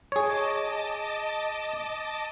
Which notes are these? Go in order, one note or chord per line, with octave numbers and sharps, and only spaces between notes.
G#4 C#5 D#5 A5 D6